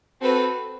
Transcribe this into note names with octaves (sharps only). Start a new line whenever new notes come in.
C4 F#4 A4 B4